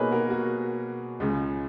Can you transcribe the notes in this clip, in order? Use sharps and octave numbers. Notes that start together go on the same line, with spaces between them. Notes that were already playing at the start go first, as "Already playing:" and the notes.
Already playing: B2 A#3 D#4 G#4 A#4 B4 C#5
F#4 A#4
F#4
C#2 C#3 G#3